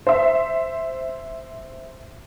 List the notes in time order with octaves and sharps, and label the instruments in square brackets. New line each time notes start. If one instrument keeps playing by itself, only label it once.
[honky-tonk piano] C5 E5